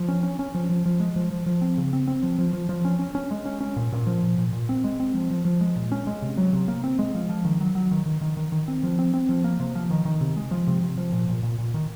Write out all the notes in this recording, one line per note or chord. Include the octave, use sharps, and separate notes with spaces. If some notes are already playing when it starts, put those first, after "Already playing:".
Already playing: F3
C#4
C#4
C#4
F3
F3
F3
G#3
F3
F3
F3
C4
C#3
C4
C4
F3
F3
F3
F3
C#4
C#4
C#4
G#3
C#4
C#4
A#2
A#2
F3
A#2
A#2
A#2
C4
G#3
C4
F3
F3
F3
G#3
A#2
C#4
G#3
C3
F#3
C3
A#3
C4
G#3
F3
F3
D#3
F#3
F#3
D#3
D#3
D#3
D#3
D#3
C4
F3
C4
C4
F3
A#3
C3
F3
D#3
D#3
C3
G#3
F3
C3
C3
F3
A#2
A#2
A#2
A#2
D#3